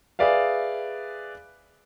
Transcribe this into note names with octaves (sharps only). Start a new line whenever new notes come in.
G#4 B4 D5 E5 F5